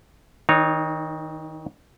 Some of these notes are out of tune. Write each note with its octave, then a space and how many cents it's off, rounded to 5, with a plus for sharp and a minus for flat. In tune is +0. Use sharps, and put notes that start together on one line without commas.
D#3 +30 D#4 -20 C#5 +0